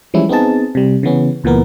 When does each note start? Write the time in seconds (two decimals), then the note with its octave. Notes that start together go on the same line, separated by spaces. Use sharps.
0.14 E3 F3 G3 G#3 C#4 E4
0.29 B3 C4 D#4 G#4 A5
0.75 C3 G3
1.03 C#3 E3 B3 C#4
1.44 C#2 A#2 E3 B3 A#4